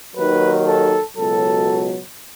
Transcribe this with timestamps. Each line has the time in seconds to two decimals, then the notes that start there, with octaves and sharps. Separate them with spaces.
0.16 D#2 D#3 F#3 B4
0.67 A4
1.17 C#2 B2 F#3 A4